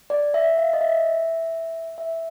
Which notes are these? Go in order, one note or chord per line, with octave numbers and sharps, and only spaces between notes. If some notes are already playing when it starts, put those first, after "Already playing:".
D5
E5
F5
D#5
E5
E5